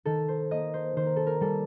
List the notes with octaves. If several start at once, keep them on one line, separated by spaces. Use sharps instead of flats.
D#3 A4
C5
A#3 D#5
C5
D#3 C5
A#4
A4
A#4
G3 A4